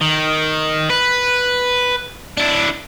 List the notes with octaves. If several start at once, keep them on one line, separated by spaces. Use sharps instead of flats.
D#3
B4
D4 E4